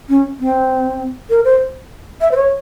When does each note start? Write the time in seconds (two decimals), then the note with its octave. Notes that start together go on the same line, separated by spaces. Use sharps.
0.09 C#4
0.40 C4
1.30 A#4
1.45 C5
2.21 E5
2.31 C5
2.36 C#5